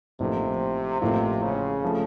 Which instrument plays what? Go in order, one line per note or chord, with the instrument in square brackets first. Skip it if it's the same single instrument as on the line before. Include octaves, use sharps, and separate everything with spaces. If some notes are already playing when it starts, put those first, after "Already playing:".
[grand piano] A1 A2 F3 A#3 D#4 [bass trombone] C3
[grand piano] A1 A2 F3 A#3 F4 [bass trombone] C3
[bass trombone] C#3
[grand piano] F3 A3